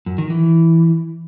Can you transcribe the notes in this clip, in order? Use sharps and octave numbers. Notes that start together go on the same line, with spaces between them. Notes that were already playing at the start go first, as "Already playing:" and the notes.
F#2
D#3
E3